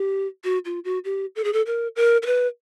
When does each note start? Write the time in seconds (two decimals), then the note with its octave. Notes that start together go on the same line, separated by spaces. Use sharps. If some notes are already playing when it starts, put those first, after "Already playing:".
Already playing: G4
0.44 F#4
0.65 F4
0.85 F#4
1.05 G4
1.36 A4
1.44 G#4
1.53 A4
1.66 A#4
1.96 A#4
2.22 A#4
2.26 B4